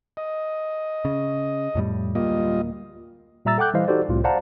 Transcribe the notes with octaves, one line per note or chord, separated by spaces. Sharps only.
D#5
C#3
F2 A2 G3
D1 G3 A#3 F4 D#5
A#2 G3 E5 A#5 E6 A6
A4 F#5 G5 D6 F#6 G6
E3 G3 E4 C5 D#5 F5
D#4 F#4 G4 A4 C5 D5
C2 A2 C3 F4
C5 D5 F5 F#5 A5 A#5